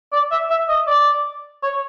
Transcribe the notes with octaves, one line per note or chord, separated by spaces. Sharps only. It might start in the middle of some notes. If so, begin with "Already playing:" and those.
D5
E5
E5
D#5
D5
C#5